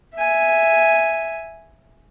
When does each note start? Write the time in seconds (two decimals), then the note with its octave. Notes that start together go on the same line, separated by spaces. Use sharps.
0.14 E5 G#5